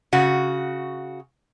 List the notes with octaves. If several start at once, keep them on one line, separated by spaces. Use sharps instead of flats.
C#3 F#4